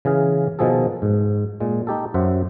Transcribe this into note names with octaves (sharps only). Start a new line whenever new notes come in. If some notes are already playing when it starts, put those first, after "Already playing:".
C#3 E3 G#4 F5
B2 D#3 F3 G#4 A4
G#2
A#2 G#3
D#4 G4 A4
F#2 C5 E5 F#5